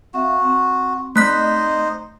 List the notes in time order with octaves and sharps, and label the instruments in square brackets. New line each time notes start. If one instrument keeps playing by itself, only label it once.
[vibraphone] C4 E5 F5 [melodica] F#4
[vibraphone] C4
[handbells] A3 F#6 B6 [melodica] D#4 C5 D#5